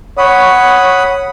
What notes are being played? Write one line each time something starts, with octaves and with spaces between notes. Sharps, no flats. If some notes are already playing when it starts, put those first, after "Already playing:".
C#5 F#5 B5 D#6